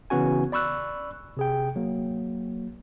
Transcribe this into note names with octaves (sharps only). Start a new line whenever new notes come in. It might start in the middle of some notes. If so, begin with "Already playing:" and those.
C#3 E3 B3 C#4 F#4 G#5
D5 B5 C#6 E6 F#6
C3 G#4 G5
F#3 A#3